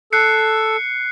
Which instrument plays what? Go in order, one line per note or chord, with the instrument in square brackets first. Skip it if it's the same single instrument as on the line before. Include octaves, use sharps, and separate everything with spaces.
[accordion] A4 E6 [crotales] F#6 C7 C#7